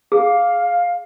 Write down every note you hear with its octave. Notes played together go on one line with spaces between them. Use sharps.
G#4 F5